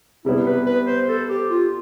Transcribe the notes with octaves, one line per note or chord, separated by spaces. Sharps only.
C3 G3 B3 E4
B4
B4
C5
A4
G4
F4